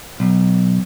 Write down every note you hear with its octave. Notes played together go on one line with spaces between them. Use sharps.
B1